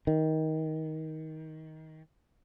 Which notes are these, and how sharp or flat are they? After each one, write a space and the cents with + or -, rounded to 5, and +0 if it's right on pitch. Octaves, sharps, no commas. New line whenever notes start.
D#3 +20